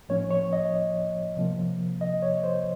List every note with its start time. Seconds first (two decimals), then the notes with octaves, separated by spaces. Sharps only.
0.09 A2 F3 A#3 C#4 C#5
0.31 C#5
0.53 D#5
1.37 C3 F3 A#3
2.01 D#5
2.22 C#5
2.44 C5